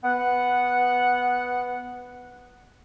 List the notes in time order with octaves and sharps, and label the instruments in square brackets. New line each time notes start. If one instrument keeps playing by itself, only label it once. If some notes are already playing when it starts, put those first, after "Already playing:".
[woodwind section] B3 F#5